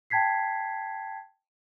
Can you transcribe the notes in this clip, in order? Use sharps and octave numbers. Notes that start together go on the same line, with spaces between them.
G5 A5 G#6 B6 C7